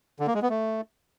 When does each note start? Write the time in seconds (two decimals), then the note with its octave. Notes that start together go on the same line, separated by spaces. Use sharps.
0.20 D3
0.27 A#3
0.35 G#3
0.42 B3
0.50 A3